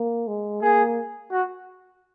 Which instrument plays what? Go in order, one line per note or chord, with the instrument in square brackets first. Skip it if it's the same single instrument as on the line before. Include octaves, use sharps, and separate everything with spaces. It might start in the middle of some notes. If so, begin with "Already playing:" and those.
Already playing: [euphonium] A#3
G#3
[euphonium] A#3 [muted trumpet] G#4
[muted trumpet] F#4